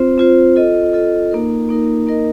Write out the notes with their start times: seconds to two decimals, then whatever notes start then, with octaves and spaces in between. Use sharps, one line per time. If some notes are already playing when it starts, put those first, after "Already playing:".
Already playing: C4 F4 C5
0.18 C4 F4 C5
0.56 F4 A4 D#5
0.93 F4 A4 D#5
1.31 A#3 D#4 A#4
1.69 A#3 D#4 A#4
2.07 A#3 D#4 A#4 D#5